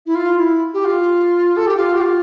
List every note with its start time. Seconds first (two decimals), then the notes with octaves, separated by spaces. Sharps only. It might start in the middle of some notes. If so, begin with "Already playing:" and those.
0.06 E4
0.15 F4
0.38 E4
0.74 G4
0.85 F4
1.57 A4
1.67 G4
1.77 F4
1.94 G4
2.01 F4